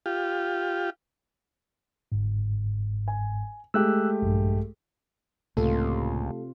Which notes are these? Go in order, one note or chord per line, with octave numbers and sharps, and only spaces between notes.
F4 G4
G1 G#2
G#5
G#3 A3 G4 E6 F#6
A#1 G2
C#2 A2 C3 A3 A#3 F4 A4